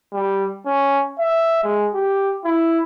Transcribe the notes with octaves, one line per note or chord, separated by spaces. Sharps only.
G3
C#4
E5
G#3
G4
E4